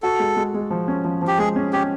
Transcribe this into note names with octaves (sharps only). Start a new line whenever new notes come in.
F#4 A4
G#3
G#3
G#3
F3
C#4
F3
F3
G4
G#3 G#4
C#4
C#4 G4